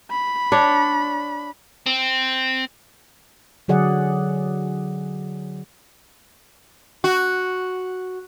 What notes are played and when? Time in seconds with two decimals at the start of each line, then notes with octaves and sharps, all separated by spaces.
0.11 B5
0.52 D4 C#5
1.86 C4
3.68 D3 F#3 G#4 D5 F#5
7.04 F#4